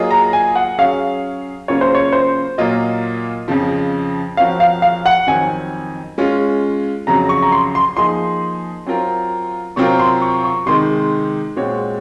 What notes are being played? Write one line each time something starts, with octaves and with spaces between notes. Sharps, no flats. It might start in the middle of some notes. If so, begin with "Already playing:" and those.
Already playing: F#3 A#3 F4 G#4 D#5
A#5
G#5
F#5
F#3 C#4 G#4 C#5 F5
C#3 F#3 A#3 C#4 F4 C#5
C5
C#5
C5
A#2 F#3 A#3 F4 D#5
F2 C#3 F3
F3 C4 F#4 A#4 C#5 F5
F5
F5
F#5
F2 D#3 F#3 C4 D#4 G#5
G#3 C#4 F4
F2 C#3 F#3 A#5
C#6
A#5
C6
C6
F3 A#3 D#4 G#4 D#5 C6
F#3 C4 F4 A#4
C3 F#3 C4 F4 A#4 C#6
C6
C#6
C#6
C3 D#3 G#3 D#4 C6
A#2 G#3 C4 F#4 C#5